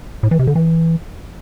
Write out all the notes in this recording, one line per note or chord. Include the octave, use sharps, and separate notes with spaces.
A2
E3
C3
D3
E3